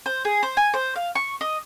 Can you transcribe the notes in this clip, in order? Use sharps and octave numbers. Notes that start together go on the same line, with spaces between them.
C5
G#4
C5
G#5
C5
F5
C#6
D#5